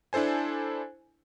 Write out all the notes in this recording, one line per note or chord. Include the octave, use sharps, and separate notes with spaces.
D4 E4 A4 C5 G#5